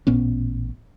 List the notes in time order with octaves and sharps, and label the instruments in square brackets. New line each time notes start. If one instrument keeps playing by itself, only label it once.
[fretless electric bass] A1 A#2 B3 C#4